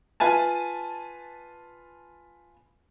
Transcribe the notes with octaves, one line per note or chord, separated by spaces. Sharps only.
F4 B4 G#5 A5